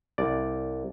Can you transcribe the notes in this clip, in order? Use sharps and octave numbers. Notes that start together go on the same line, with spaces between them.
C2 D5